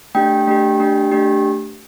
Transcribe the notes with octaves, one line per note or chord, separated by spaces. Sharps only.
A3 D4 G4 G5
A3 D4 G4
A3 D4 G4
A3 D4 G4